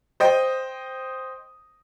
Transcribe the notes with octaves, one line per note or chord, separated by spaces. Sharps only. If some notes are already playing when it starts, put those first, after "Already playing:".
C5 D#5 G5 D#6